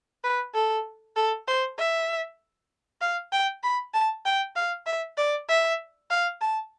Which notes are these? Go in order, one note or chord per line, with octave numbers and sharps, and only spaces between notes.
B4
A4
A4
C5
E5
F5
G5
B5
A5
G5
F5
E5
D5
E5
F5
A5